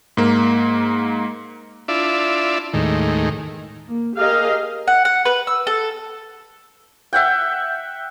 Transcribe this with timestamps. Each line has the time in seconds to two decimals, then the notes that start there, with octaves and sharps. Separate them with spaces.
0.17 G#2 A#3
1.88 D4 E4 F4 D5 E5
2.74 D#2 A2 D#3 G#3
3.88 A#3
4.16 G4 G#4 A#4 D#5 F5
4.88 F#5
5.05 F#5
5.25 B4
5.47 E6
5.67 A4
7.13 E5 F#5 G5